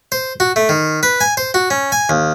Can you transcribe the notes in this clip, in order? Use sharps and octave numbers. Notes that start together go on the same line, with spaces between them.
C5
F#4
A3
D#3
B4
G#5
C5
F#4
C#4
G#5
D#2